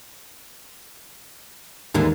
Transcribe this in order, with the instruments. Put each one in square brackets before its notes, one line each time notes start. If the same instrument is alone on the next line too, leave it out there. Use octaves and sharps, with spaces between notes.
[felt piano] D#2 [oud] G#2 D3 E3